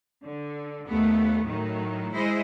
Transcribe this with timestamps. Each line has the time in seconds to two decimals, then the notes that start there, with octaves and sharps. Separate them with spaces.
0.25 D3
0.86 D#2 A3 B3
1.45 A2 D#3 F#3
2.12 G#3 E4 C5 D#5